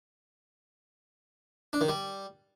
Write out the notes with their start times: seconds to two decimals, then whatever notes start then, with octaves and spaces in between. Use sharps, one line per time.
1.73 D4
1.81 D#3
1.89 G3